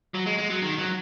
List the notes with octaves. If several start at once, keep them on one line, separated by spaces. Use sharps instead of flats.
F#3
G#3
G#3
F#3
D#3
F#3